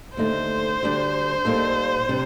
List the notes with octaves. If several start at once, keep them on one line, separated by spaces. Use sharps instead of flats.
D#2 D3 A3 D#4 C5
D2 D3 G3 D4
A#2 G3 A#3 D#4 A4
C3 G3 D4